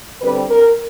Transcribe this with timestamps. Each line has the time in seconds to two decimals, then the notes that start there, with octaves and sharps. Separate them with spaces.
0.22 D3 G3 C4 B4
0.50 A#4